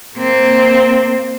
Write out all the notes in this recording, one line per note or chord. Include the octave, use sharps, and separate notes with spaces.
A#3 C4